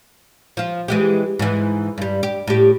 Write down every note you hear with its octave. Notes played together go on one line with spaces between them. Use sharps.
F3 F4
E3 G#3 G4
G#2 E3
G2 G3
G4
A2 G4